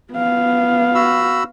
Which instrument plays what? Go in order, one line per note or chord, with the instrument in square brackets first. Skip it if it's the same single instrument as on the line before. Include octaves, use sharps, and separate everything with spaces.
[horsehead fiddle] B3 F5
[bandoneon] F#4 B5 E6